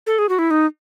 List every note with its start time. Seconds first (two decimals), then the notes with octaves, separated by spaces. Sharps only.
0.07 A4
0.19 G#4
0.29 F#4
0.39 E4
0.51 D#4